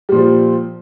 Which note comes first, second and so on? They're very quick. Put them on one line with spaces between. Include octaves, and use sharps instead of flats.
G3 A#2 F3